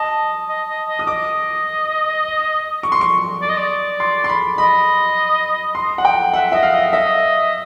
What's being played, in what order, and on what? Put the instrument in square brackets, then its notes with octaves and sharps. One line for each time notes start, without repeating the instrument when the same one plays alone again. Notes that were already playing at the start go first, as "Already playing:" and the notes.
Already playing: [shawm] D#5 [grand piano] A5
[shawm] D#5
D#5
D#5
[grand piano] D#6
[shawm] D#5 [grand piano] D6
[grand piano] C#6
C6
C#6
[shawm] D5
D#5
D5
[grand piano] C6
C6
B5
[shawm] D#5 [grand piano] B5
[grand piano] C6
F#5
G5
[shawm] E5 [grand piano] F#5
[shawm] D#5 [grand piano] E5
[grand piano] F5
[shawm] D#5
[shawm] D#5 [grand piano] E5